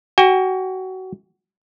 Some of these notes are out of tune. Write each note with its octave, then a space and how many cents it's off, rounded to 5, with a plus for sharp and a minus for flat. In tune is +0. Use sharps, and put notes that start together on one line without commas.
F#4 +25 G5 +40